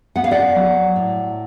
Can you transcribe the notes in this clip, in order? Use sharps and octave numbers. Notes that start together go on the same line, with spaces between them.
B3 F#5
F5
D5 F#5
F#3
A2